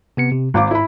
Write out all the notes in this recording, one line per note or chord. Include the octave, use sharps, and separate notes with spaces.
C3 B3 C#7
C3
G#1 G#2 F5 D6
E4 B5